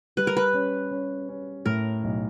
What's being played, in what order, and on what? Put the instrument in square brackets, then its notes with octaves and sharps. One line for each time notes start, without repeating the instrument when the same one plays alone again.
[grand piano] G3 [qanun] B4
[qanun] A#4
B4
[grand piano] C#4
C#4
C#4
[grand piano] A2 [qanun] A#4
[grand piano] B1